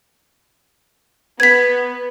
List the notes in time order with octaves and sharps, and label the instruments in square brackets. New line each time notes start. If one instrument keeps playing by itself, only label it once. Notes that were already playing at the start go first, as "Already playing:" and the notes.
[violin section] B3 [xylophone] G#6 B6